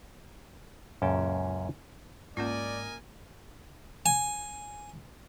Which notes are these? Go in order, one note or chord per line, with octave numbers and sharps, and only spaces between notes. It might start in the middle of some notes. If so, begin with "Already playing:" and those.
C#2 F#2 A#2 C#4 G5 A5
G#2 A#3 C#4 F4 A#4 D5 D#5 G#5
G#5